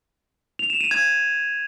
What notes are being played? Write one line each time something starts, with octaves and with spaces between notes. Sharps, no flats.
F7
E7
D#7
G#6